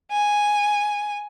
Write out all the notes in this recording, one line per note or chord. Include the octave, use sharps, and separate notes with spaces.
G#5